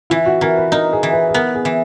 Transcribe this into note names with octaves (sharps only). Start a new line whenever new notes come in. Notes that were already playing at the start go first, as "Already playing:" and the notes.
E3 E4
F#4
E3 A#4
B4
D#4 A#4
G#4
E3
B4
G#4
B3 A#4
G#4
E3